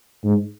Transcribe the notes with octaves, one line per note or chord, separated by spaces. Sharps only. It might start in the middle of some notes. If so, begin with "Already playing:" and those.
G#2